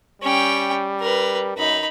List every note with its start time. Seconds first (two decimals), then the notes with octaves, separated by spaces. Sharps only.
0.22 G3 C#4 G5
1.00 A#4 B4
1.57 F#2 D#4 B5